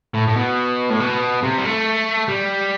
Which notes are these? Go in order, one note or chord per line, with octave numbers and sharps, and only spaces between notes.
A2
A2
B2
A2
B2
C3
G3
A3
G3